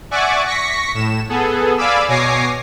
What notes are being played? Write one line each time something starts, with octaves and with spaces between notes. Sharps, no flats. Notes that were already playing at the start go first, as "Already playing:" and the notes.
D5 E5 F#5 G#5 C#6 D6
C#6 A#6 B6 C#7
A2 E7
B3 G#4 A4
D5 F5 G#5 B5 D6 E6
B2 C#5 G#5 D6 A#6 C7